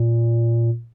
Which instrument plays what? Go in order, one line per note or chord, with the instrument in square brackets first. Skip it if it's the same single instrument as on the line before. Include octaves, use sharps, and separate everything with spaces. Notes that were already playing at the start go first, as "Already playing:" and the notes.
Already playing: [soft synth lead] A#2